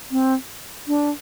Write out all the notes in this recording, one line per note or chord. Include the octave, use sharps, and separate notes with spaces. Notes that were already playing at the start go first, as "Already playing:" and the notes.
C4
D4